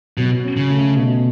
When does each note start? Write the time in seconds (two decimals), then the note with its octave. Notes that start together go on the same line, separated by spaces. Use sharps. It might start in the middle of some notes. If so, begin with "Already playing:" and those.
0.18 B2 F#3
0.44 C#4
0.57 C#3
0.70 A3
0.96 B2